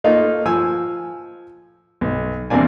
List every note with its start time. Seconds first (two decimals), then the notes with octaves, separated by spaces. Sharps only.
0.04 A3 A#3 D#4 F4
0.46 F3 G#5 E6
2.01 B1
2.50 E2 C3 A#3 D4 G#5